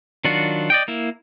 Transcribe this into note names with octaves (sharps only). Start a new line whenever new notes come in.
D#3 F#3 D4 F4 F#4
D5 D#5 G5
A#3 E4